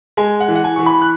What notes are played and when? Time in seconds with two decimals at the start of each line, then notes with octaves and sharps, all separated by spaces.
0.17 G#3 G#5
0.40 F#5
0.48 E3
0.55 F#5
0.64 G#5
0.76 E3 C#6
0.86 B5
1.01 F#6